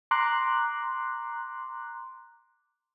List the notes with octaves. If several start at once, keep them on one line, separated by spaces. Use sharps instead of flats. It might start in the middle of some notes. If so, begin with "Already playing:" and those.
A#5 C6 D6 F#6